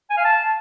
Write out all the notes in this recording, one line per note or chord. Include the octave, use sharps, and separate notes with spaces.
G#5
F5
A5